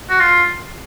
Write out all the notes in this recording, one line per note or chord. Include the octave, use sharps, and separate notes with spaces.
F#4
F4